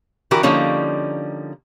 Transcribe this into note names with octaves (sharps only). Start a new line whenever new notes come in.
D3 E3 F#4 G4 A#4
D3 F3 G3 A#3 C#4 D#4